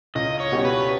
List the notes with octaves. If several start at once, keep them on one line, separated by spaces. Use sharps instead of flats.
C#2 D#5
C#5
B2 G3 C#4
B4